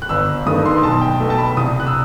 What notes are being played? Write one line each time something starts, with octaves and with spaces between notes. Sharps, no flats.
F#6
G1 E6
G2 D#3 A3 D#6
C6
B1 A5
G5
B2 A3
A5
B5
C2 D#6
F#6
E6